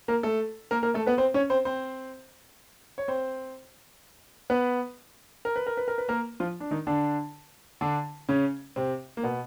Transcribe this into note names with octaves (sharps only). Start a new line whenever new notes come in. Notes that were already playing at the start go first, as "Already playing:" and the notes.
A#3 A#4
A3 A4
A#3 A#4
A#3 A#4
A3 A4
B3 B4
C4 C5
C#4 C#5
C4 C5
C4 C5
C#5
C4 C5
B3 B4
A#4
B4
A#4
B4
A#4
B4
A#3 A#4
F3 F4
D4
D#3 D#4
D3 D4
D3 D4
C#3 C#4
C3 C4
A#3
B2 B3